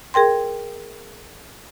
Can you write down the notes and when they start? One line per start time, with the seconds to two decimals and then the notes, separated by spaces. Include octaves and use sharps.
0.14 G#4 A#4 G5 C6